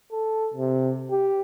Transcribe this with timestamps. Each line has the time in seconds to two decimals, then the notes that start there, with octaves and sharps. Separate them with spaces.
0.12 A4
0.54 C3
1.11 G4